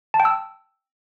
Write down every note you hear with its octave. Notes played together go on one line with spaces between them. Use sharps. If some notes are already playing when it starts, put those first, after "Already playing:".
A5
G5
E6